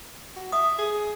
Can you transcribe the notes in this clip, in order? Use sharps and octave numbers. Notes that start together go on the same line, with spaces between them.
F#4
E5 D#6
G#4